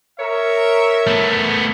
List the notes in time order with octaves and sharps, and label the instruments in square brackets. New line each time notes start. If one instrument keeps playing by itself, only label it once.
[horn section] A#4 C#5 E5
[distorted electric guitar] A3 B3